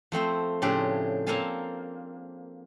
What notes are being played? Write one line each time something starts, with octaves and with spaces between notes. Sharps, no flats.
F3 A3 C4 C5
A2 C#3 F3 C4 D4 G4
A#3 C4 A4 F5 G#5 A5